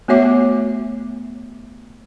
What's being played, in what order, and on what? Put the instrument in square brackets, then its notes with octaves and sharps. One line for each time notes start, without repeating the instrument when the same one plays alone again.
[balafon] A3 B3 F#4 C#5 E5 D6